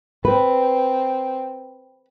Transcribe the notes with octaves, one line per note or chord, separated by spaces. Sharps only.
C4 B4